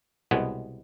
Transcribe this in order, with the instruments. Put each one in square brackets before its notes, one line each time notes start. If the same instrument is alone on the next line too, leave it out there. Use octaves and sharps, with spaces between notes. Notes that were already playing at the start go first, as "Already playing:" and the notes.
[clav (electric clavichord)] C2 B2 G#3 B3